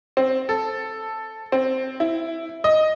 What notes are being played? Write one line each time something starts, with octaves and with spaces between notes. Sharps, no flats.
C4
A4
C4
E4
D#5